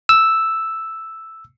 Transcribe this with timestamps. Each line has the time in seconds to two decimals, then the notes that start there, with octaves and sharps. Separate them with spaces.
0.09 E6